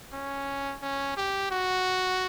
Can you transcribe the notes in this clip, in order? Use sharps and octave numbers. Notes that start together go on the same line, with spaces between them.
C#4
C#4
G4
F#4